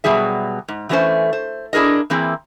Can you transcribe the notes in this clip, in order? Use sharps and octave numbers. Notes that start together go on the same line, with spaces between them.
B2 F#3 G3 G#4 E5
G#2
E3 F#3 A3 C#4 B4 C5
C5
D4 E4 G#4 A#4 D#5
E3 A#3 C4 E4 G#4